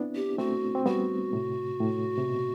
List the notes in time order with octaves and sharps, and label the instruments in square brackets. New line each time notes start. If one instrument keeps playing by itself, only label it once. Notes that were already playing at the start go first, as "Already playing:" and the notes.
Already playing: [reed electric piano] B3 C4 D4 E4
[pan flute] G4
[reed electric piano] A3 C4 [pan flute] F#4
[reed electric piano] C4
[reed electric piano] G3 B3 [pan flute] F#4
[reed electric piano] A2 C3
A2
C3
B2